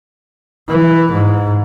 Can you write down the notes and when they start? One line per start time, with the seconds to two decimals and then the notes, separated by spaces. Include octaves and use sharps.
0.69 E3
1.13 G#2